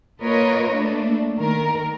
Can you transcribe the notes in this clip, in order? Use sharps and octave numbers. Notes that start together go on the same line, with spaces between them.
A#3 F4 A#4 B4 C#5 D#5
A3 A#3 D4
D#3 A3 A#4